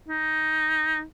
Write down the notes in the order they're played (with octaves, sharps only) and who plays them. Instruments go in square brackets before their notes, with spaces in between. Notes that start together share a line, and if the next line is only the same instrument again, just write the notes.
[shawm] D#4